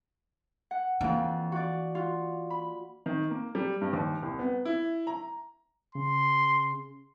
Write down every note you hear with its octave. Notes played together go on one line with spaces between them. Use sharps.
F#5
F2 E3 A#3 D4
F#4 D5
F4 F#4
B5
D#3
A#3
G3
G2
D#2
C2
B3
E4
A#5
C#3 C6